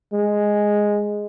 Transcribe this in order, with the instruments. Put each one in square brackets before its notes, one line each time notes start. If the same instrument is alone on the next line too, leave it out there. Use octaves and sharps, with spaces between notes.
[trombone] G#3